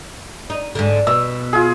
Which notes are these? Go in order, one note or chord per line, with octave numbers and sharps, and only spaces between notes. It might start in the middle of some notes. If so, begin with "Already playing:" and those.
D#4
G#2 D3
B2 E6
F4 G#4